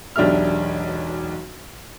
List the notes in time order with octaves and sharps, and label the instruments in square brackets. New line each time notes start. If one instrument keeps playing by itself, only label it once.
[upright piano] E1 B1 D4 G4 E5 F6